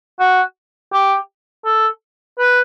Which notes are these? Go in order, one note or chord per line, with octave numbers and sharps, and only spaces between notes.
F#4
G4
A4
B4